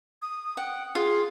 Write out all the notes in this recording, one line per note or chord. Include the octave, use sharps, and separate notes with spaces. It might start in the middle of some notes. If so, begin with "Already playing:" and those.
D#6
F#5 G5
F4 G#4